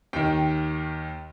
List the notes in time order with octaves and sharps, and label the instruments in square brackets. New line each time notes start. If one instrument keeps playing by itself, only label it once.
[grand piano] D#2 D#3 G5